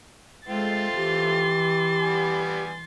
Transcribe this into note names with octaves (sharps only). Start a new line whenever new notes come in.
G#3 A3 C4 F4 C6 A6
E3 G4
G3 B3 G#5